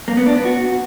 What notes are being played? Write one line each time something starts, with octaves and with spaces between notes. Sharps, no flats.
A#3
B3
D4
B3
F#4